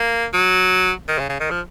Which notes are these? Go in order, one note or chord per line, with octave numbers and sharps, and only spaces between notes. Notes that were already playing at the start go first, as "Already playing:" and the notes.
Already playing: A#3
F#3
D#3
C#3
C#3
D#3
F3